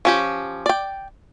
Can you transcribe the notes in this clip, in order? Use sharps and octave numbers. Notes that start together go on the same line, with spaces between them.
F3 C#4 G4
D5 G5